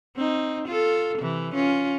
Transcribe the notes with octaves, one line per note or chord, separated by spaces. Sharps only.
C4 D#4
F4 A4
C3 E3
C#4 F4